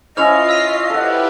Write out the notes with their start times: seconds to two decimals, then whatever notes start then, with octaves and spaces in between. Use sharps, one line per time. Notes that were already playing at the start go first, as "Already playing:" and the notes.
0.17 C#4 E4 F4 C#5 D#5 F6 C7 F7
0.49 E6 B6 D#7
0.90 E4 G4 A4 B4 F#5